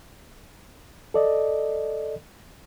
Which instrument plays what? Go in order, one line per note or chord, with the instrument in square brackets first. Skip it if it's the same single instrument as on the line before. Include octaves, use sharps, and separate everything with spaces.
[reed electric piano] A4 D5 D#5